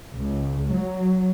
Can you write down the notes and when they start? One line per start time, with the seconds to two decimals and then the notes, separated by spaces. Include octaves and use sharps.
0.16 C#2
0.75 F#3